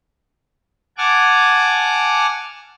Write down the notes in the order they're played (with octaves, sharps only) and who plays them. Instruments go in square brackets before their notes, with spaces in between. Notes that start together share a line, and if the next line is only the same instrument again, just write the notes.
[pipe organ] F#5 G#5 A5 D6 F6